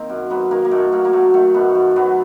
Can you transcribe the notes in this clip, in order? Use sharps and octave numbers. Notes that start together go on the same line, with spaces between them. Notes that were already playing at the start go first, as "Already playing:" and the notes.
Already playing: D#3 A#3 C4
F#2
F#3 B3
D#3 A#3
A#3
F#2 A3
F#2 A#3
A#3
F#3 A3
D#3 A3
F#2 B3
F#2
F#3 B3